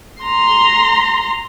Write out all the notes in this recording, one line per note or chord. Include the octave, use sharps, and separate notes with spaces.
A#5 C6